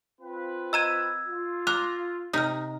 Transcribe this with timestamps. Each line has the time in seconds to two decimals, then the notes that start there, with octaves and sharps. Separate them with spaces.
0.21 C4 F4 B4
0.73 D#5 A#5 E6 G#6 D#7
1.28 F4
1.67 A#5 D6 F6 F#6
2.33 C3 D#4 D#6 F6